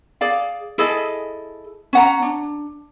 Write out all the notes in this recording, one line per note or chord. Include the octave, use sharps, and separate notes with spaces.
G#4 D5 F5
E4 G#4 A4 D#5
C#4 F#5 A#5
D4